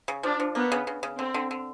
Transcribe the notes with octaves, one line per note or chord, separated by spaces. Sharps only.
C#3
F3 D4
F3
A#3 B3
C#3
C#3
C#3
D3 C4
D3
D3